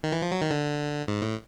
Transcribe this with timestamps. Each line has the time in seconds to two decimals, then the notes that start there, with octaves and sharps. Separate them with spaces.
0.03 D#3
0.12 E3
0.22 F3
0.32 F#3
0.42 D#3
0.51 D3
1.08 G#2
1.22 A2